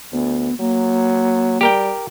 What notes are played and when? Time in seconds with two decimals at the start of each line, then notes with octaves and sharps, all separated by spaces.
0.13 D2 B3
0.60 F#3 A#3
1.61 G3 G4 A#4 G5